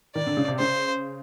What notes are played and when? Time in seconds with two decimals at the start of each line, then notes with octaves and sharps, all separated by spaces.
0.15 D#3 D5
0.27 D3
0.37 C#3
0.48 C3
0.59 C#3 C5